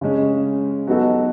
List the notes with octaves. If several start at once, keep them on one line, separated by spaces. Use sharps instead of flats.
C#3 G#3 C#4
F#3 B3 D#4 F#4 A4